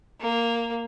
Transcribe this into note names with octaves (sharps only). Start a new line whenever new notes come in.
A#3